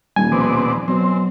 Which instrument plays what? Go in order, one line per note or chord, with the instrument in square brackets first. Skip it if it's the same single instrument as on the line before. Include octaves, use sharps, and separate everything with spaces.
[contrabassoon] D#1 [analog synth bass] G3 [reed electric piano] G#5
[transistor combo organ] B2 C4 D5 [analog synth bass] F3
[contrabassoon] B2 [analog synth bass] F#3 [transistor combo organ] C4